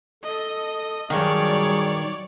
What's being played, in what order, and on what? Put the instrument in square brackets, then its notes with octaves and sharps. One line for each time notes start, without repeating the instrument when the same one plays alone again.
[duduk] A4 [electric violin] D#5
[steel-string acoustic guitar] G2 D#3 [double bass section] F#3 G3 [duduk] G#4 [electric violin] C#5 D5